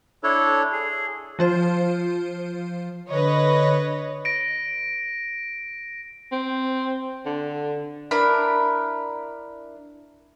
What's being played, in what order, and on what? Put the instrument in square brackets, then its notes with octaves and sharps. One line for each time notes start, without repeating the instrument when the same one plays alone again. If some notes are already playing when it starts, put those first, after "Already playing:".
[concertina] D4 E4 A4 C#5
G#4
[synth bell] F3 F4 C5
[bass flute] D3 [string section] B4 C#5 D#5
[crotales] A#6 D7
[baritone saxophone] C4
D3
[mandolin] D4 E4 A#4 B5